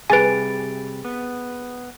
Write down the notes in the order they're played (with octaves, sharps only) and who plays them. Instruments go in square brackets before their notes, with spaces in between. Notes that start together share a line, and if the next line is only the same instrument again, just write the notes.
[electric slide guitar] C3 G3 [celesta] G#4 A6 D7 [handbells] B4 G#5
[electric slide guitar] B3